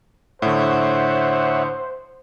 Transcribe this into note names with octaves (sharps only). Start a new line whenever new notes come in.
A2 D3 C5 C#5 E5 F#5